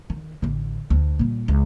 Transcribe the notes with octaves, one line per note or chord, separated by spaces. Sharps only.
D#3
A1 D3
D2
A#2 G3
C#2